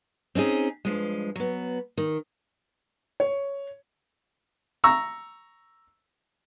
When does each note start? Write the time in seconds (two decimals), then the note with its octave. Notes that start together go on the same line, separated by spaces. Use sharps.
0.35 C4 C#4 D#4 G#4
0.85 G2 F3 G#3
1.36 F#3 B3
1.97 D#3
3.20 C#5
4.84 A#5 C#6 E6